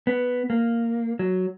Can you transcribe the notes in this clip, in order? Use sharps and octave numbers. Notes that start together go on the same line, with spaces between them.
B3
A#3
F#3